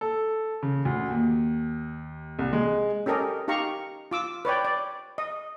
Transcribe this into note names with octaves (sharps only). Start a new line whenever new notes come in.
A4
C#3
D2
D#2
C2
G#3
C#4 G4 A4 A#4 D#5
D#4 G4 F5 A#5 C#6
F4 D6 E6
B4 C#5 D5 G5
D5
D#5